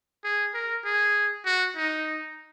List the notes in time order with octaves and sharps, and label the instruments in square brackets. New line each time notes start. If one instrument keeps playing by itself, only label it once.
[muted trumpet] G#4
A#4
G#4
F#4
D#4